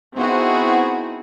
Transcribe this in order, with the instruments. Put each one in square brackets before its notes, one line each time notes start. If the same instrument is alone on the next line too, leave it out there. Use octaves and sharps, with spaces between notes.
[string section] B3 C4 D#4 E4 F#4 G#4